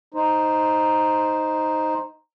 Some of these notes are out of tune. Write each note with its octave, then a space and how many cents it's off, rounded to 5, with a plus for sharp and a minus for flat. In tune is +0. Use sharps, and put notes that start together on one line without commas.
D#4 +0 C5 +0